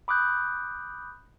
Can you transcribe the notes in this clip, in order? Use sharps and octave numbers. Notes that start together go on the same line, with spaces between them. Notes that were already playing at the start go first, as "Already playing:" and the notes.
B5 D6 D#6 F#6 G6